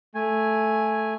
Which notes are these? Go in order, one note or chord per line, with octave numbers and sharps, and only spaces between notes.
A3 G#5